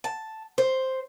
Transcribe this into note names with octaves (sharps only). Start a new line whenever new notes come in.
A5
C5